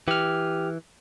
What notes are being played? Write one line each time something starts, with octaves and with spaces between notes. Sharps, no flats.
E3 G4 F6